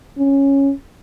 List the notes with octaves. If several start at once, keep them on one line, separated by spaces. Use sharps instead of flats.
C#4